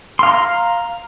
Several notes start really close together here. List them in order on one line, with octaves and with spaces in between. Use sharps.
C6 F5 A#5